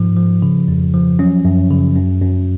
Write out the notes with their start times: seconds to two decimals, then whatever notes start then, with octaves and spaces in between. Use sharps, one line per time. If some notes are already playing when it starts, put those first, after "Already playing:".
Already playing: G#2 F3
0.17 F3
0.42 C#3
0.68 F2
0.94 F3
1.19 F#3 C#4
1.45 F#2
1.71 C#3
1.96 F#2
2.22 F#2